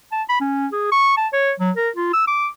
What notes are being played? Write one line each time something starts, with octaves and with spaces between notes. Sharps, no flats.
A5
B5
C#4
G#4
C#6
A5
C#5
F#3
A#4
F4
E6
D6